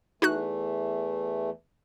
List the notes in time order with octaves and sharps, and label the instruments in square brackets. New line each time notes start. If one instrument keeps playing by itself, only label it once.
[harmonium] E2 E3 A3 [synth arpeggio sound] D#4 F#4 F#6